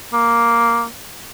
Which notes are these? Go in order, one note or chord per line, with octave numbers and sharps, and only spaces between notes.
A#3